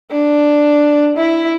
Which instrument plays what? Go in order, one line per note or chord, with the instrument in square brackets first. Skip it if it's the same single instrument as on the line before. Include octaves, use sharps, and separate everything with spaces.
[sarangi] D4
E4